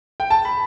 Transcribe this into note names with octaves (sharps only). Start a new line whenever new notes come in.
G5
A5
B5